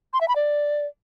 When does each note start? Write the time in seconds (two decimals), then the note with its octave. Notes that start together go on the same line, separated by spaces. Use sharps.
0.13 C6
0.21 E5
0.28 B5
0.36 D5